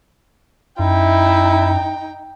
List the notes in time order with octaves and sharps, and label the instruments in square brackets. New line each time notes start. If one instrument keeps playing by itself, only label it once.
[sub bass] F#2 [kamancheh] D#4 [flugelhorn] E4 [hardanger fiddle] G5